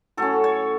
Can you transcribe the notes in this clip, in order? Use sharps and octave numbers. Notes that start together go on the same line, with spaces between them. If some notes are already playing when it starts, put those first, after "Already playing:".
A2 F#3 C#4 A4
C#5